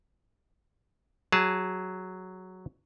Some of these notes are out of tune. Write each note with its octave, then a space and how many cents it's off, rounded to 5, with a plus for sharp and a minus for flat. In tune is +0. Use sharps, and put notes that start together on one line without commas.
F#3 +0 G#4 -10 A5 +0